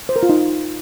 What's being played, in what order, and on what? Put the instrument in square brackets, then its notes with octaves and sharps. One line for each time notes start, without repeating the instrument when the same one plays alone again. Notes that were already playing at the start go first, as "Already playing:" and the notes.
[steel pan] C5
A#4
F4
D#4